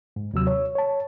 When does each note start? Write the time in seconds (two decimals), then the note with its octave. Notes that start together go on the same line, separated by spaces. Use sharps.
0.16 G#2
0.34 D#2 C3 F#3 E6
0.47 C#5
0.75 C#5 A5